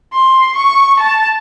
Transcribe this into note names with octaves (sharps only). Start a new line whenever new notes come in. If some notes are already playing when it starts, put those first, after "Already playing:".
C6
C#6
A5